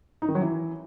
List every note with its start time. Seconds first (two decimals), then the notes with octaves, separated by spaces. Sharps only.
0.22 D#4
0.28 D#3
0.35 F#3
0.42 E3